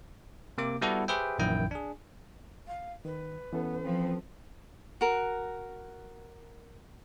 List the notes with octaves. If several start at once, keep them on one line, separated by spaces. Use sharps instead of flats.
C3 A#3 D6
G3 B3 E4 F#4 A4 F#5
G4 G#4 B4 C5 E5 G5
A#1 F#2 D#3 E3 E4 G5
D4 G#4
F5
D#3 B4
E3 B3 C#4 A4
F3 C4
F#4 A#4